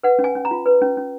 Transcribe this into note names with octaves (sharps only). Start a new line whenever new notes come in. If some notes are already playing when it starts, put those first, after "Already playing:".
B4 F#5
C#4
G#5
C#4
A#5
F4
B4
C#4
C#4